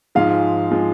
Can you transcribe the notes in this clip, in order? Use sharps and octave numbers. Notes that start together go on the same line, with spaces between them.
G#2 F3 G#3 F5
F3 G#3